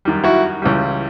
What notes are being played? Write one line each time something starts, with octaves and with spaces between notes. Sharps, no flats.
F#2 D#3 G3
E4 F#4
C#2 C#3 E3 G3